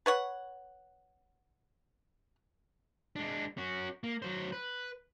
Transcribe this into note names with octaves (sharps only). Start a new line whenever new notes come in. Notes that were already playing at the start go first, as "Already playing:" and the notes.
B4 C#5 F#5
G#3 D4
C#4 F#4
A#3
F#3 C5
B4